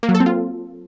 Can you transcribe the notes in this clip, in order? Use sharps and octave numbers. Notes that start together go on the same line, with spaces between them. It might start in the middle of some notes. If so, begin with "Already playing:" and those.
A#3
F#3
A4
C4
F4